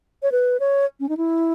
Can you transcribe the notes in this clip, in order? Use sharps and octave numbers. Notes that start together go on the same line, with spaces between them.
C#5
B4
C#5
C#4
D#4
E4